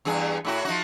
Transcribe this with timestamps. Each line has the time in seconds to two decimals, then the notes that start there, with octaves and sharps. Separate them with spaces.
0.05 E2 G2 G#4
0.45 A2 E4 F#4
0.65 F3 D#4 F#4